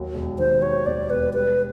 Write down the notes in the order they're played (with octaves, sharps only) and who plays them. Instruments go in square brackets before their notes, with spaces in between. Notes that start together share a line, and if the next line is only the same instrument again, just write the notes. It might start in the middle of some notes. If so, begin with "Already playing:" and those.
Already playing: [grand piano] D#2 D#3 F#3
E1
[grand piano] D#3 [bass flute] C5
[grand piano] F#3 [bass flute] C#5
[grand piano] D#2 [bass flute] D5
[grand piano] E1 [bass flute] B4
[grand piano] G3 [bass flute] B4